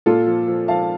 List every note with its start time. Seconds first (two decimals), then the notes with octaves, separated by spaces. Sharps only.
0.06 A#2 F4 A4
0.26 F3
0.48 F3
0.68 F3 F5 A5